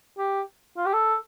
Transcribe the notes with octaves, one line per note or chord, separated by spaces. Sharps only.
G4
F4
G4
A4